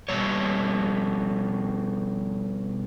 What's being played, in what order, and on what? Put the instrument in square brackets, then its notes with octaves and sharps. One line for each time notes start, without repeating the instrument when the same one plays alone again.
[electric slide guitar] B2 G3 C#5